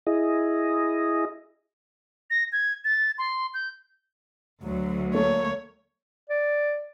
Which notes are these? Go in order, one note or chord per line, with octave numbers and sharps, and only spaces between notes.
E4 G#4 D#5
A#6
G#6
A6
C6
G6
D2 F#3
A3 A#3 C#5
D5